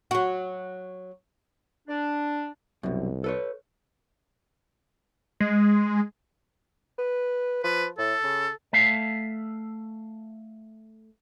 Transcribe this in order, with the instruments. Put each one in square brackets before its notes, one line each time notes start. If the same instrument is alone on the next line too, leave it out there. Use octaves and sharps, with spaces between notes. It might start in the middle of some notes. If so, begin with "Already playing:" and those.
[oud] F#3 F#4
[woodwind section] D4
[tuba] C2 [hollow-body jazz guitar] F#2 B2
[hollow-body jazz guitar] A4 B4 C#5
[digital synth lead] G#3
[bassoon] B4
[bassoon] F3 [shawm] B4
[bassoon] A2 [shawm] A4
[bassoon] C#3
[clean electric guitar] A3 E5 F5